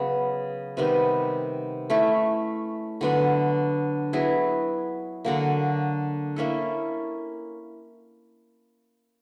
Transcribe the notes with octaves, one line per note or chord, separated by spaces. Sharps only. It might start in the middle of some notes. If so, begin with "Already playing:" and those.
Already playing: C#3 F#3 B3
C3 D#3 G3 B3
A3 C#4 E4
D3 F#3 B3 D4
F#3 B3 E4 G#4
D3 F#3 A#3
A#3 C#4 E4 A4